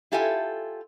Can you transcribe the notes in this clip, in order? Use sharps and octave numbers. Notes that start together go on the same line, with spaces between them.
E4 F4 G4 A4 E5 G#5